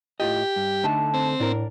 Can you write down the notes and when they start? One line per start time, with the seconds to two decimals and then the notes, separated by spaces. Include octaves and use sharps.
0.20 A2 F4 G4 D#5
0.56 G2
0.84 D3 A3 D#4 A5
1.14 C4
1.40 A2 D4 A#4